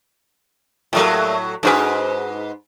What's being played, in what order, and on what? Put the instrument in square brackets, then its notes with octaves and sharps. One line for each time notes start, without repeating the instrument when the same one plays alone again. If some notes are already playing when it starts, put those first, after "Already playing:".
[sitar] A2 F#3 [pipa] G3 A3 A#3
[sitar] G#2 B4 [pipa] D4 F#4 G#4